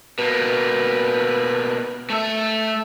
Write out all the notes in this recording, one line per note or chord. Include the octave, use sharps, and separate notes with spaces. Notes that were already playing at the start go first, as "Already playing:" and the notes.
B2 A#3 B4
A3 E5